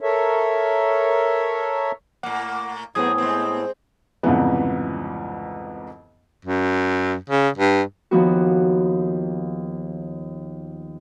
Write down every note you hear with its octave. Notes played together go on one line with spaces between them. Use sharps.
A4 A#4 C#5 E5
A2 A#3 F#5
A2 F#3 B3 C4 G#4 D#6 G#6
G#3 C4
C2 F2 G#2 C#3 E3 B3
F#2
C#3
G2
D#2 F3 B3 F#4